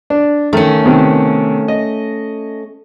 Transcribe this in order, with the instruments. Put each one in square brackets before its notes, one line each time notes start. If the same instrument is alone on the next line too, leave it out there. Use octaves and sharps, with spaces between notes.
[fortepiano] D4
[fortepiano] D#3 [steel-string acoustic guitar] A3 C#4
[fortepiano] C3 D#3 B3
D#5